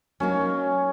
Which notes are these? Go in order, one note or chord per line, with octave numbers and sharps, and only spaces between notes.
F#3 A#3 C#4 D#4